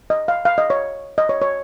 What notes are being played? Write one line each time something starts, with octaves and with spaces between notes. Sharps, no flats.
D#5
F5
F5
D#5
C#5
D#5
C#5
C#5